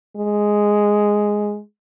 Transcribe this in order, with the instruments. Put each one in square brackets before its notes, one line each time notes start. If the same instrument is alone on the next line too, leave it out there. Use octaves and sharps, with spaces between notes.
[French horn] G#3